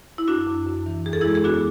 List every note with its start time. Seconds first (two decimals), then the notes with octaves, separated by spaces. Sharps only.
0.18 E4
0.28 F#2 D4 F#4
0.47 F#2
0.67 F#2
0.86 E3
1.06 E2 G#4
1.13 A4
1.21 G#3 E4 G#4
1.35 G#4
1.44 B3 D4 F#4